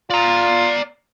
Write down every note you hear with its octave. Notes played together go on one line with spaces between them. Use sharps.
F4 D5 A#5